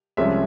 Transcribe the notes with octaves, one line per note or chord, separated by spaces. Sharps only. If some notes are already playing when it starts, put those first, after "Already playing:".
C2 C3 F3 G#3 C#4 E5